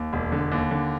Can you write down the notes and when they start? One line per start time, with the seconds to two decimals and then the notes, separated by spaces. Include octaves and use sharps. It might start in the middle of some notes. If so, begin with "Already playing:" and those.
Already playing: D#2
0.13 E1
0.32 D3
0.52 D#2
0.71 D3